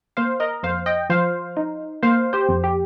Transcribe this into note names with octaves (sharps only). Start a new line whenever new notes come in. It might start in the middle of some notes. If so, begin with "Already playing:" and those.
A#3 C5 F5
A#4 D#5
F2 C5 F5
D#5 G5
F3 C5 F5
D#4
A#3 C5 F5
G4 C5
F2
G4